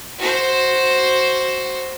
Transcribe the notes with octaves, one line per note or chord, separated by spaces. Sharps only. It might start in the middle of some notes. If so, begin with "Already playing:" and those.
F#4 C5